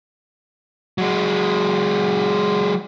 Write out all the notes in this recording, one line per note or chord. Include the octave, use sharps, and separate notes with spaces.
F#3 G#3